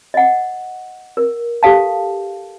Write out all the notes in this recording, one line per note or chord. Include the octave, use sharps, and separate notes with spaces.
D#5 F#5
A#4
G4 A4 F5 A5